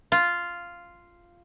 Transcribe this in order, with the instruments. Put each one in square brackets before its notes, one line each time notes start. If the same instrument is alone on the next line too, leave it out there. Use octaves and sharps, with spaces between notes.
[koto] F4